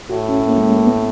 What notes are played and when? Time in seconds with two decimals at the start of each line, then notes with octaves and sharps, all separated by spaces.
0.10 A2 F#4
0.29 C#4
0.47 A#3
0.58 G#3
0.76 A#3
0.86 B3